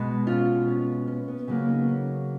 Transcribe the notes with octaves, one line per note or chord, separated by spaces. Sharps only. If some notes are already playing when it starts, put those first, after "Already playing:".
Already playing: B2 G#3 B3
C#4 F4
C#4
C#4
B3
C#3 F#3 A#3 C#4
B3 D#4
C#4